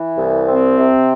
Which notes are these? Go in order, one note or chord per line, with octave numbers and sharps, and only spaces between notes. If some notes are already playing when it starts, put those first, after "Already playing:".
Already playing: E3
C2
C4
C3